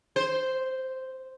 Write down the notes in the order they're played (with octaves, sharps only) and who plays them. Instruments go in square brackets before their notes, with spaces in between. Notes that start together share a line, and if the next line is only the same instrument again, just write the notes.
[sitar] C5